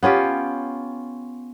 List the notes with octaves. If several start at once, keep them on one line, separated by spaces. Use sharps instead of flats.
B3 C#4 F4 G4